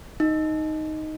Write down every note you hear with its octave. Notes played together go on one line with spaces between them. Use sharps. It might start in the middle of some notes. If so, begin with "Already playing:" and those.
D#4